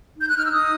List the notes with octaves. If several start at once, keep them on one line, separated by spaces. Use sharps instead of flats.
D#4 G6
F#6
D#4 F6
E6
D#4 D#6